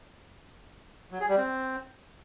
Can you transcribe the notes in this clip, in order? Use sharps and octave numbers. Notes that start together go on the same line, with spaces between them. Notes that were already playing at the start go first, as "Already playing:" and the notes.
F#3
G#4
G3
C4